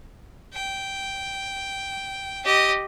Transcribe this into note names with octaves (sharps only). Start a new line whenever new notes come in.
G5
G4 D#5